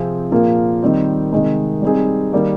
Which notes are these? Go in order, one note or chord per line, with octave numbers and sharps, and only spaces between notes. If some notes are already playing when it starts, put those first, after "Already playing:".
Already playing: C3 F3 C4 F4 G#4
A#2 F3 A#3 F4 G#4
D#3 G3 C4
C3 D#3 G#3
G3 C4 D#4 G#4
D#3 G3 A#3